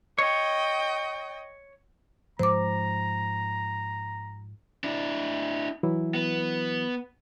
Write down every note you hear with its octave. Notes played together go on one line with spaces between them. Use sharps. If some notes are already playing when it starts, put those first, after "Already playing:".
C#5 D#5 G5
G#2 F3 C5 A#5 D6
D4 E4
E3 F#3 E4
B3